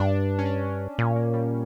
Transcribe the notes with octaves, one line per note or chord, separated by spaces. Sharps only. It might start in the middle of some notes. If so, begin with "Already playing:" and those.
Already playing: G2 D4
C#4
D4
A#2 C#4
A#3
G3